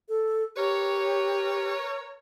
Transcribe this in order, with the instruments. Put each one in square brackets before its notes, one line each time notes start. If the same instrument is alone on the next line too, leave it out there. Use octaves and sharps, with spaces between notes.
[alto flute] A4
[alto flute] G4 [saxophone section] A#4 B4 C#5